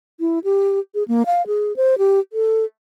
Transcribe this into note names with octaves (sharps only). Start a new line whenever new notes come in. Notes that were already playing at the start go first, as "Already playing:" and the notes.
E4
G4
G#4
A#3
F5
G#4
C5
G4
A4